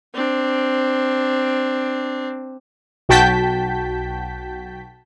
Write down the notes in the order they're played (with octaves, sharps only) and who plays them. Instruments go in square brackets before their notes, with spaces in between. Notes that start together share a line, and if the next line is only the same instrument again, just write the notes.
[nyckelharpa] C4 D4
[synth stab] B1 F#4 G5 A5 G6 B6